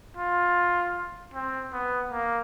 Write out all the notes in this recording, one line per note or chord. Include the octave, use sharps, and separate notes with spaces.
F4
C4
B3
A#3